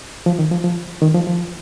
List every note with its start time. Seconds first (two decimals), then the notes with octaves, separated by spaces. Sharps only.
0.26 F3
0.39 D#3
0.51 F3
0.64 F3
1.02 D#3
1.14 F3
1.27 F3